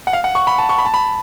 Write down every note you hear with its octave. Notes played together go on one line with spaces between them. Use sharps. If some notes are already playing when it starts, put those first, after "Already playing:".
F#5
F5
F#5
C#6
B5
A5
C#6
B5
A5
B5